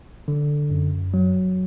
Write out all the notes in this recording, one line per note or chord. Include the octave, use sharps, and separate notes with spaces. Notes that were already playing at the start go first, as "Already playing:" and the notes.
D3
F#2
F#3